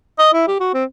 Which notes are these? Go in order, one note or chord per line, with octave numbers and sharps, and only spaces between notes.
D#5
E4
G4
F#4
C4